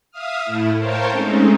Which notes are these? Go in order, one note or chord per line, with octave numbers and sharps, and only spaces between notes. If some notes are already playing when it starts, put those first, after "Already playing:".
E5 F5 D#6 F6
A2 A3 E4
A#4 C5 C#5 F5 G5 A5
G#3 A3 C4 C#4 D#4